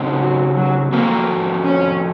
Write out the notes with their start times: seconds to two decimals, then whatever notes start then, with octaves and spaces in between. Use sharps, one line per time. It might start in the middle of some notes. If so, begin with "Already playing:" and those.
Already playing: C#3 A3 C4 D#4 F#4
0.22 F#3
0.57 F#3
0.92 F3 A3 A#3 C4 F#4 A#4
1.64 C#4